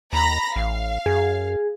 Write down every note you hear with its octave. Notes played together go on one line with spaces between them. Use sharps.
D#2 A#5 B5 A#6
A1 F5
F#2 G#4